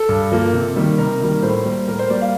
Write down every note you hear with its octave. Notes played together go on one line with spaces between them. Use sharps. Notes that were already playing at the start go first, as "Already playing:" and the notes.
Already playing: A4
G2
F3 A#3
C3
D#3 G3 A#3
C3 A#4
D#3 G3 A#3
A2 C5
G3 A#3
A2 A#4
C5
G3 A#3 D5
F5